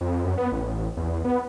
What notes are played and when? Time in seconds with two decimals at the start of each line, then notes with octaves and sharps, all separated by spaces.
0.01 F2
0.25 F#2
0.38 B3
0.52 A1
0.97 E2
1.25 B3